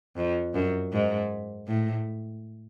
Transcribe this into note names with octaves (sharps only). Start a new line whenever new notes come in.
F2
F#2
G#2
A2